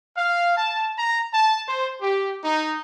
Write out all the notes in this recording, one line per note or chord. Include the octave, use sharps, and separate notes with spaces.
F5
A5
A#5
A5
C5
G4
D#4